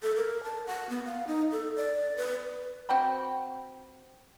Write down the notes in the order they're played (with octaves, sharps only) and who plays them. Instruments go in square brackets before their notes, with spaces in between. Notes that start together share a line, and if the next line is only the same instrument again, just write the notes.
[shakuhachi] A4
A#4
A5
F#5
B3
F5
D#4
A4
D5
B4
[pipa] C4 F#4 G5 B5